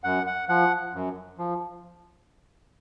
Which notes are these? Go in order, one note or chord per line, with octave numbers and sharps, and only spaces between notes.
F#2 F#5
F#5
F3 F#5
F#2
F3